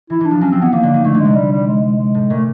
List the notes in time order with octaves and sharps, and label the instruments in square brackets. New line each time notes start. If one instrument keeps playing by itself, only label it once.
[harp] E3 [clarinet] E4
[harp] E3 [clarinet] D4
[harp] F3
[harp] F#3 [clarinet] C#4
[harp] F3 [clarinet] C4
[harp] E3 [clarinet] B3
[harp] D#3 [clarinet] A#3
[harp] D3
D#3
[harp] D3 [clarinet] A3
[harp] D3
[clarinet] G#3
[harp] C3
[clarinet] G3
G3
G#3
G#3
G#3
[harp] A2
[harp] A#2 [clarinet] A3